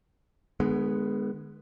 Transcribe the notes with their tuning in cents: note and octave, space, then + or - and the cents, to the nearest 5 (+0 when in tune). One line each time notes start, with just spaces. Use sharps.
D3 +45 G#3 +0 B3 +0